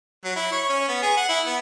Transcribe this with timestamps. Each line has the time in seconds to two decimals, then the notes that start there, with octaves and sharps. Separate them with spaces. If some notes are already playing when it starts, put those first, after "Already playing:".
0.24 F#3
0.36 E4
0.51 C#5
0.69 C#4
0.88 B3
1.02 G#4
1.17 F#5
1.29 E4
1.46 B3